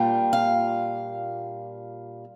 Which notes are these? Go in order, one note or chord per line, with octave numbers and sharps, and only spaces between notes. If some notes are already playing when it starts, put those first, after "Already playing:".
Already playing: A#2 G3 A#3 D4 F4 G5
F5